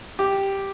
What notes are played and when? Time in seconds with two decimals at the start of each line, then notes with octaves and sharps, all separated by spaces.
0.19 G4